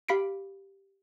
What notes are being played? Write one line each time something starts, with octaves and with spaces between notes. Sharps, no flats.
G4 F5 B5 B6 C7 D7